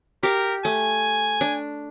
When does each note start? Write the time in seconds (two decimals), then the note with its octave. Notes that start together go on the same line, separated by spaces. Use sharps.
0.23 G4 A#4 F5
0.65 A3 G#5
1.41 D4